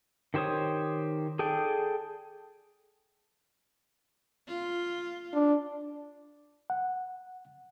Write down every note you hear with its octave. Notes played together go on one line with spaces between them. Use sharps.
D#3 G4 C5 C#5 D#6
G#4 A4 D5 G5
F4
D4
F#5